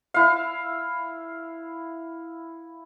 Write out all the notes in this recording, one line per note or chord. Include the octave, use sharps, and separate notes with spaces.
E4 F5